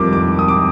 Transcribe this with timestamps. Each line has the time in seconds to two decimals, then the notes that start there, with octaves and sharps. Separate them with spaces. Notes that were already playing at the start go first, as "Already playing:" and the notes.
Already playing: F2 D#3 G3 A#3 D6
0.13 D6
0.39 D#6
0.48 D6